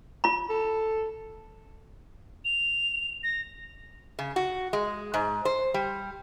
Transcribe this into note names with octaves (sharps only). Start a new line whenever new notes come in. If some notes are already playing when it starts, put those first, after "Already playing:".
F4 B5
A4
F7
A#6
C#3
F#4
G#3
G#2
C5
G3